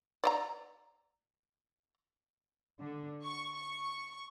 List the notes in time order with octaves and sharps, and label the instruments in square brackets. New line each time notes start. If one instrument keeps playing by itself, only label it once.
[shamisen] D5 D#5 A#5
[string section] D3
C#6
C#6